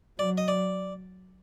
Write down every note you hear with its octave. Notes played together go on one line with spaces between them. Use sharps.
F#3 D5
D#5
D5